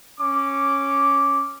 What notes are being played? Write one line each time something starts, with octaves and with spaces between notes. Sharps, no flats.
C#4 D6